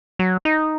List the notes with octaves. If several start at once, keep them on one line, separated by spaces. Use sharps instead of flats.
F#3
D#4